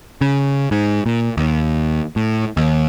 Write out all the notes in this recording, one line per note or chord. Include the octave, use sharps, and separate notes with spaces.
C#3
G#2
A#2
D#2
A2
D#2